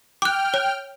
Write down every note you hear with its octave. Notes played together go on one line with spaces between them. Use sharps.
G5 D6 F6 F#6
C#5